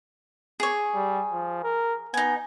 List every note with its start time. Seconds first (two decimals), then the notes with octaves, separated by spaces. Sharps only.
0.60 G#4 C#5
0.94 G3
1.32 F3
1.64 A#4
2.14 B3 D#4 G#5